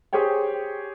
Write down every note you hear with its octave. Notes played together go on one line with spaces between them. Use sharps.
G4 G#4 C5 C#5 G5